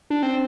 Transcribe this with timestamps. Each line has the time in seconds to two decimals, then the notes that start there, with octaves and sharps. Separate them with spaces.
0.10 D4
0.23 C4